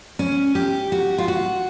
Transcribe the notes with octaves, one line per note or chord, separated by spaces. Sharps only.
C#4
G4
F#4
F4
F#4